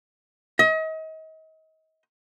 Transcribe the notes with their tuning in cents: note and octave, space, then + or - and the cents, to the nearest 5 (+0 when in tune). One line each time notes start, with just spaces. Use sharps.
D#5 +35